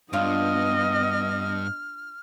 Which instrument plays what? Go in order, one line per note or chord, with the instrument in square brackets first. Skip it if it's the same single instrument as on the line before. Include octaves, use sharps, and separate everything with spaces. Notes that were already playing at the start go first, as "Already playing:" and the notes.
[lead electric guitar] G2 [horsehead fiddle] B3 D#5 [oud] D4 F4 [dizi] F6